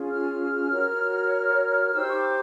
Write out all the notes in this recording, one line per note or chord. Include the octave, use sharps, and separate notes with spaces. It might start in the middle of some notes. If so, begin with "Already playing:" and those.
Already playing: C#4 F4 G#4
F6
F#4 A#4 C#5
D#4 G4 C5 E6
C#6
D6